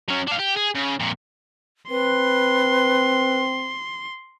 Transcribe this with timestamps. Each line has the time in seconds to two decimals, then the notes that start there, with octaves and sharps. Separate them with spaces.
0.08 F#3 C#4
0.27 D4 F5
0.39 G4
0.56 G#4
0.75 C#3
1.00 F2 A#2
1.90 C4 B4 C6